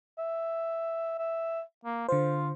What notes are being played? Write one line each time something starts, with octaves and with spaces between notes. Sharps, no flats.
E5
E5
A#3
D3 F4 C5